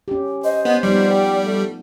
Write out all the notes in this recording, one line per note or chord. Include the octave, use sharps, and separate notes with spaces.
C#4 G4
C5 D#5
B3
F3 G3 B3 D#4 D5
G4
A3